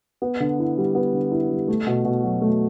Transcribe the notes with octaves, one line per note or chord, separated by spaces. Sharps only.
B3
D3
E4
G3
B3
D3
E4
G3
A3
B2
B2
F#3
A3